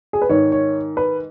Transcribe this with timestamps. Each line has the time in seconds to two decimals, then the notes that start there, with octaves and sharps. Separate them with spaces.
0.13 G#4
0.22 B4
0.29 G#2 D#3 C#5
0.52 C#5
0.97 B4